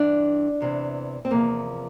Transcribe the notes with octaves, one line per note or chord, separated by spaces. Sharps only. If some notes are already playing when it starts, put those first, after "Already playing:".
Already playing: G2 E3 D4
E2 C3 E3
C4
E2 C3 F3 A#3